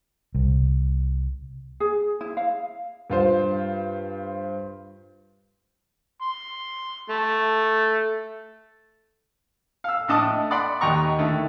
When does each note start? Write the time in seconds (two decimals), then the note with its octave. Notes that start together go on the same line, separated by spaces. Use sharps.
0.35 C2
1.80 G#4
2.21 E4
2.37 F5
3.10 G2 F4 C5
6.22 C6
7.10 A3
9.84 F5 E6
10.08 A2 D4 D#5 A5 D6 D#6
10.24 A3
10.51 D5 F#5 B5 C6
10.81 D#2 D#5 F#5 G5 A#5 C#6
11.19 D3 D#3 A3 E4